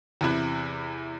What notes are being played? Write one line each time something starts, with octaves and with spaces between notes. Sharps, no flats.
E2 C3 E4 F#6